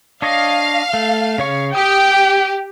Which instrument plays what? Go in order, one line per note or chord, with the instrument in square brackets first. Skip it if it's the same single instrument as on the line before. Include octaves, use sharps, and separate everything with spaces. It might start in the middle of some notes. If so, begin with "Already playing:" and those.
[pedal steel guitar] D4 C#5 D#5 [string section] F5
[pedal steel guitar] A3
C#3 C#5 C#6
[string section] G4 [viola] G5 [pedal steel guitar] D#6